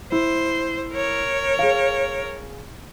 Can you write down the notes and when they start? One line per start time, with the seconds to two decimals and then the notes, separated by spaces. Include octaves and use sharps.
0.12 E4 C5
0.93 A#4 C#5
1.59 G#4 F5